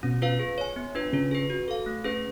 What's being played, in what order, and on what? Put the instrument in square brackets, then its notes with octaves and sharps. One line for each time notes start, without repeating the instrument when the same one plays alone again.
[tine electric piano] B2 B3 [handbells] C#4
[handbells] F4 B4 F5
G#4
C#5 G#5
B3
D4 F4 B4
[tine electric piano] C#3 C#4 [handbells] F4
[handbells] G#4 B4
F#4
A4 F5
A3
C#4 G#4 B4